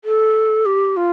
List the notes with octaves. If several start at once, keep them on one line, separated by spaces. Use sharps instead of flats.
A4
G4
F4